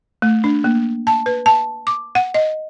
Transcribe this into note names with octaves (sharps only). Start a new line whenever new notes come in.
A3
D4
A#3
A5
B4
A5
D6
F#5
D#5